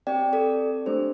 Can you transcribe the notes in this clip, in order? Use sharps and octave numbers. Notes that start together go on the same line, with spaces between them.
C4 G4 D5 G5
A4 D5
A3 D4 G4 C5